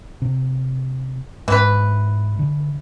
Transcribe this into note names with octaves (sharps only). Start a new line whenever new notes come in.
C3
G#2 E3 B4
D3